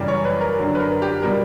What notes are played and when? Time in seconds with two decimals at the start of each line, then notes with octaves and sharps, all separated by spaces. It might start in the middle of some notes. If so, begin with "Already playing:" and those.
Already playing: F#2 C#3 E3 G3 D5
0.08 C#5
0.25 B4
0.41 A#4
0.58 F#2 D3 F#3
0.75 B4
0.79 A#4
1.02 G4
1.22 B2 G3 A#4